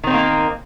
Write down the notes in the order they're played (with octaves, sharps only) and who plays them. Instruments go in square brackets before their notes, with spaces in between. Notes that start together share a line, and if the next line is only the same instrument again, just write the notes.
[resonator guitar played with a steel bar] D#3
C4
D#4
A#3